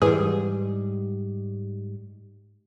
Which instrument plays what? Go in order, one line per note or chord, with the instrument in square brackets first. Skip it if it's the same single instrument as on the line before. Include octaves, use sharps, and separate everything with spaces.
[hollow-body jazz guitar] G#2 G3 [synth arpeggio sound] E3 G#4